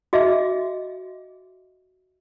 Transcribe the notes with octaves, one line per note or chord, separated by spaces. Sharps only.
F#4 G#4 D#5 E5